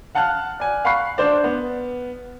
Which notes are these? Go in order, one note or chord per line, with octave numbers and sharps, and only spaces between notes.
F5 F#5 A5 F6 F#6
D5 G#5
F5 F#5 B5 C#6 F#6 C7
D4 C5 D5
B3